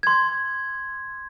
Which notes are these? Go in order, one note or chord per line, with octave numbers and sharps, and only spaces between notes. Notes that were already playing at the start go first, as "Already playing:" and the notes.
C6 G#6